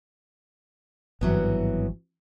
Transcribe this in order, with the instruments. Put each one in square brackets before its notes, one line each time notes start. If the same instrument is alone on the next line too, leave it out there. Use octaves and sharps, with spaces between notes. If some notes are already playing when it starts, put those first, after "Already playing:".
[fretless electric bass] G#1 G2 [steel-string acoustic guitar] E3 F#3 B3